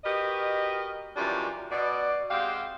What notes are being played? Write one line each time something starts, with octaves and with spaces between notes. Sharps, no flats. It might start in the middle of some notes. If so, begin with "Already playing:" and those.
F#4 G4 A#4 B4 D#5
F#2 D#3 E3 G3 D4 F4
B2 D5
G#3 C4 F#4 G4 F5